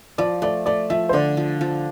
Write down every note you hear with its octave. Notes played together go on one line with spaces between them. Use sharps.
F3 D5
A3 D5
A3 D5
F3 E5
C5
D3 D5
F3
F3